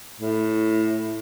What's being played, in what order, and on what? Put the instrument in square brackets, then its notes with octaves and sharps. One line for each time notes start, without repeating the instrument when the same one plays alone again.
[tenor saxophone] A2